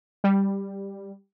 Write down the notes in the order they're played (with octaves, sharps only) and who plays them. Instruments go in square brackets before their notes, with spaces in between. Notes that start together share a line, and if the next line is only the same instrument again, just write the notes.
[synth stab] G3